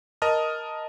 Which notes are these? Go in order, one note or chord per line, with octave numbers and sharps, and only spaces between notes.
A#4 D#5 A5 D#6 F6